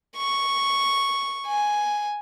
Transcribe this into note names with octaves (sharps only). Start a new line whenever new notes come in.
C#6
G#5